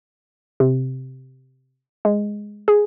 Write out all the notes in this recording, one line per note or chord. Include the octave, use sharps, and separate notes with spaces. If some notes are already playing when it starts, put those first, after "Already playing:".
C3
G#3
G#4